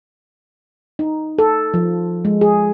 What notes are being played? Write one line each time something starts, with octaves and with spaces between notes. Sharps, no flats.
D#4
A4
F3
G#3
G#4